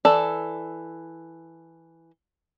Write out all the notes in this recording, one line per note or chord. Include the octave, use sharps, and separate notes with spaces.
E3 A4 D5